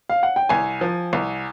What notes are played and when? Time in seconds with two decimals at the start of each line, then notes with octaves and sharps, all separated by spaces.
0.10 F5
0.23 F#5
0.36 G5
0.49 C2 G#5
0.81 F3
1.13 C2